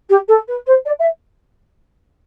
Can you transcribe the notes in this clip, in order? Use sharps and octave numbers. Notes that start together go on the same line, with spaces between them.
G4
A4
B4
C5
D5
E5